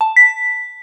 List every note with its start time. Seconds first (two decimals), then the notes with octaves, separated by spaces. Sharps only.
0.01 A5
0.16 B6